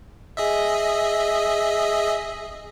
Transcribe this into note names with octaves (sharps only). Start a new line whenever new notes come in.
G#4 D#5 E5